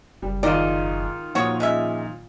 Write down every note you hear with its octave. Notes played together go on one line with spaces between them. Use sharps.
F#1 G3
G#2 D#3 F4 D5 D#5 D#7
A#2 F3 F#4 C#5 D#6
G#3 C#4 E5